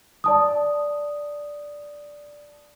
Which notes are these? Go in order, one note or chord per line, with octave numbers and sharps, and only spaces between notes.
D5 A5 D#6